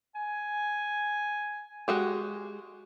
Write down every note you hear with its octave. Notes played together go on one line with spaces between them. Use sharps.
G#5
G#3 F#4 G4